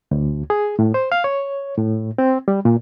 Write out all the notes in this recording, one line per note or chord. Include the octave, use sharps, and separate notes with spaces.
D2
G#4
A2
C5
F5
C#5
A2
C4
G3
A#2